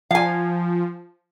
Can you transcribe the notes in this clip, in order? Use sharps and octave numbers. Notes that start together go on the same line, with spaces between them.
F3 F5 G#5